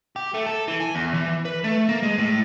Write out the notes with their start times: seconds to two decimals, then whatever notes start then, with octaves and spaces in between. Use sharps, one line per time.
0.16 G4
0.34 A3
0.46 A4
0.68 E3
0.80 G#5
0.95 E2
1.14 E3
1.45 B4
1.64 A3
1.89 A#3
2.03 G#3
2.18 A2